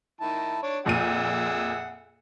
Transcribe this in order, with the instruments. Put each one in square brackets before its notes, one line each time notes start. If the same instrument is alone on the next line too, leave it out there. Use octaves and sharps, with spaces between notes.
[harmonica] D#3 E4 A5
D4 C#5
[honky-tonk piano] F2 A#2 D#7 [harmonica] G#4 E5 F#5